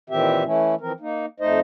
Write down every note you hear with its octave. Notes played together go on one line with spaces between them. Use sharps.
A#2 D#3 E3 C4 G4 E5
E3 A3 C#4 E4
E3 F3 C4 A#4
A#3 D#4
F2 A3 D#4 C5 D#5